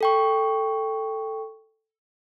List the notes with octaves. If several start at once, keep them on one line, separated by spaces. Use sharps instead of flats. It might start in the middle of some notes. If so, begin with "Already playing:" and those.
A4 G5 C#6